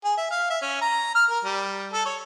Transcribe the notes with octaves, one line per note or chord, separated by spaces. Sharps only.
G#4
E5
F5
E5
C#4
A#5
F6
A#4
G3
A4
C#5